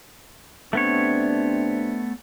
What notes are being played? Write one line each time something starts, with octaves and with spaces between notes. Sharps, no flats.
C3 A3 B3 C4 D4 C#5